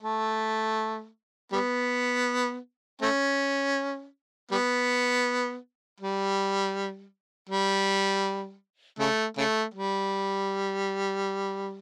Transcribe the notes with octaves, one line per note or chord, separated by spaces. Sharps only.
A3
G3 B3
A3 C#4
G3 B3
G3
G3
C#3 A3
C#3 A3
G3